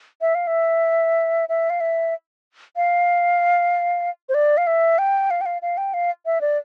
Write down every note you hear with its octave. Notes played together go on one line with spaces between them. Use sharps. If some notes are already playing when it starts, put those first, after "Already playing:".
E5
F5
E5
E5
F5
E5
F5
C5
D5
F5
E5
G5
F5
G5
F5
F5
G5
F5
E5
D5